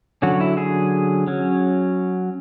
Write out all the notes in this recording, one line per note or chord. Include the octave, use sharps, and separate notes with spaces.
D3 F#3 C#4 F#4
E4
G#4
F#3 C#4